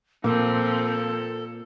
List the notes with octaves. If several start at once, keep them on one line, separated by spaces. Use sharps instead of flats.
A#2 F3 A#3 C4 A4